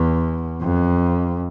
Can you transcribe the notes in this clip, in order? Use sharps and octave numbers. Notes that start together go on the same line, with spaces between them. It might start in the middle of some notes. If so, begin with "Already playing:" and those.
Already playing: E2
F2